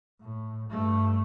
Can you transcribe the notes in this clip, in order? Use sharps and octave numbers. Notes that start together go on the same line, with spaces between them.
A2
G2 A3